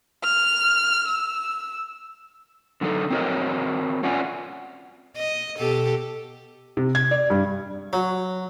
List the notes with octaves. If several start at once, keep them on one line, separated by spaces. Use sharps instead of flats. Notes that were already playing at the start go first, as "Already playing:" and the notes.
F6
E6
D3 F#3 D#4 A4
C4 D4 F#4 A#4 C#5 D#5
C#4 F4 D5 F#5 G#5
D#5
B2 G4 A4
C3
G#6
D5
G2
F#3